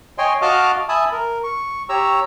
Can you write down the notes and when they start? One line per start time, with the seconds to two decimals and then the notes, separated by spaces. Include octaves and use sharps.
0.18 C#5 D#5 G5 G#5 C6
0.42 F#4 D#5 F5 A5 D6 F6
0.89 E5 G#5 A5 B5 D#6
1.12 A#4
1.44 C#6
1.89 G4 C#5 A#5 E6